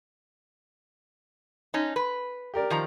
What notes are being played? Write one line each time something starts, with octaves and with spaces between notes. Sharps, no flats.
C#4 D#4
B4
G4 A#4 D5
D#3 F3 A#5